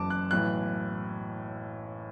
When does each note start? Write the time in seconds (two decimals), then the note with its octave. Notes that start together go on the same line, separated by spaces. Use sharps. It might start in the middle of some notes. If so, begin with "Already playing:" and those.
Already playing: F#1 F#2 E3 A5 D6
0.10 F#6
0.31 B1 A2 E3 F#6